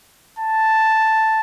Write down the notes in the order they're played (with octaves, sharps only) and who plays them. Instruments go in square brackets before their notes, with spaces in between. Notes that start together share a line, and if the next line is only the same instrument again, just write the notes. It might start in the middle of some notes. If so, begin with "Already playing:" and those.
[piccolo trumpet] A5